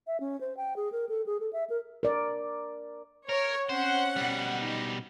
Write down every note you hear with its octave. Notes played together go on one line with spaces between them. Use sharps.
E5
C#4
C5
G5
G#4
A#4
A4
G#4
A4
E5
A#4
A#4 D5
A#4 C#5
C4 C#4 C5 F#5
B2 G3
D#4